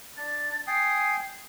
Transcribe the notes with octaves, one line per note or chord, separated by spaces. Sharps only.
D4 A6
G5 G#5 D#6 C7